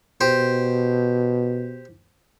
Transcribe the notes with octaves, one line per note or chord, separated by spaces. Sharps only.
B2 G4 C5